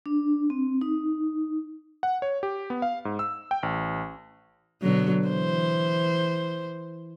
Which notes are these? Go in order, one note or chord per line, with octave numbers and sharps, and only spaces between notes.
D4
C4
D#4
F#5
C#5
G4
B3
F5
G#2
E6
G5
A1
B2 D3 F#3
E3 C5